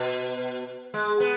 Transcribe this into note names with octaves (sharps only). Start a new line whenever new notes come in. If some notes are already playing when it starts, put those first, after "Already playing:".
Already playing: B2
G#3
B3